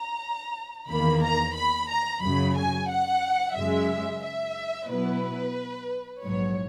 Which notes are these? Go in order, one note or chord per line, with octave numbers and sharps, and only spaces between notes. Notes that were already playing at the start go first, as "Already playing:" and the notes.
Already playing: A#5
E2 D#3 A#3 B5
A#5
B5
A#5
F#2 C#3 F#3 B5
G#5
F#5
F#2 C#3 G#3 E5
E5
B2 F#3 B3 E4 B4
A#1 G#2 F#3 C#5